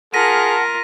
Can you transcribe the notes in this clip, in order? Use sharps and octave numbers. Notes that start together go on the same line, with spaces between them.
F4 G#4 A#4 F#5 A5 A#6 B6 D#7